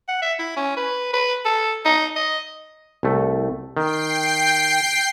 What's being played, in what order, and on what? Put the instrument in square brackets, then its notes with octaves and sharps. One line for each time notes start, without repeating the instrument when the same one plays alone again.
[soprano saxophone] F#5
E5
E4
C#4
B4
B4
A4
D#4
D#5
[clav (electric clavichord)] C2 A3
[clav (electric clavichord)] D#3 [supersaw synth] G5 C7